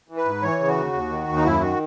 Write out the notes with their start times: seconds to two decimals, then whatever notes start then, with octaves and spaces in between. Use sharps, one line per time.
0.09 E3
0.17 B4
0.25 G#2
0.42 E3 C#5
0.59 C#3
0.68 F#4
0.76 D#2
0.93 D#2
1.10 D#3
1.28 D#2
1.36 D#4
1.44 F#2 E4
1.61 D#3 F#4